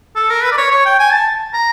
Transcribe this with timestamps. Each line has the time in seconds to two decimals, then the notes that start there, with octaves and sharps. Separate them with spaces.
0.16 A4
0.30 A#4
0.44 B4
0.52 D5
0.58 C#5
0.71 C#5
0.86 G5
0.99 G#5
1.12 A5
1.54 A#5